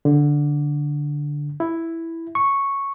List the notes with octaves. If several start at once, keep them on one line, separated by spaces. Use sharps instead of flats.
D3
E4
C#6